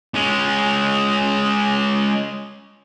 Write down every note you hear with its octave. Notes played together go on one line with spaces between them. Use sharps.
G#3 C#4